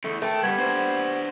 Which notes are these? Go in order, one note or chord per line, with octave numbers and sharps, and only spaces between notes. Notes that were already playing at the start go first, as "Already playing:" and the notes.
E2 A3
A3 A#4 G5
G2 G3 B3 G#6
D4 C5